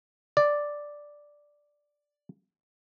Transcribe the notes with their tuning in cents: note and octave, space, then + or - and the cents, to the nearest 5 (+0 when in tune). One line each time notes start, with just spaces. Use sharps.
D5 +0